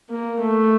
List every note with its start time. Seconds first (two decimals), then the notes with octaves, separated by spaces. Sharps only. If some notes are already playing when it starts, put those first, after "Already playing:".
0.10 A#3
0.40 A3